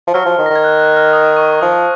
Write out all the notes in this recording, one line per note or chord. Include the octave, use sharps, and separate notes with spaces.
F3
F#3 F6
F3
D#3
A#6
D#3
G#6
F#6
F#6
F6
D#6
C#6
F3 D#6